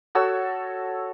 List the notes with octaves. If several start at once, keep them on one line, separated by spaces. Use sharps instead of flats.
F#4 A4 C#5 E6